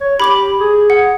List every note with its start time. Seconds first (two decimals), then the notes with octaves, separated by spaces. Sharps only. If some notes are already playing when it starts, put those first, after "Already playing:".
0.01 C#5
0.20 G4 B5 D6 F#7
0.60 G#4
0.90 F#5